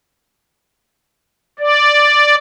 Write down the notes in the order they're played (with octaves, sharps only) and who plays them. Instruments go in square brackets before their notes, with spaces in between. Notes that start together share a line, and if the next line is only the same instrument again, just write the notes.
[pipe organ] D5